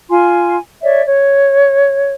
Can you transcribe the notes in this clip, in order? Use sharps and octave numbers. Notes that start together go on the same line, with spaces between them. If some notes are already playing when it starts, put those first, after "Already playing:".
F4 G#5 C6
C#5 D5 E5
C#5